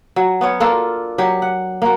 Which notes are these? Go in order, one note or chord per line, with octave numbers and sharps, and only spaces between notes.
F#3
B3 C#4 C#5
A#3 D4 F4 A4
F#3 G4
F#5
A#3 F#4